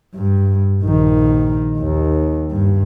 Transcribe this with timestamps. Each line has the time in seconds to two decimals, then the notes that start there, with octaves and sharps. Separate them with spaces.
0.16 G2
0.83 A#1 D#3
1.78 D#2
2.51 G2